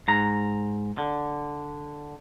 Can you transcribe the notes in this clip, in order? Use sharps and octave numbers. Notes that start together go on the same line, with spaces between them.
G#2 A#5
D3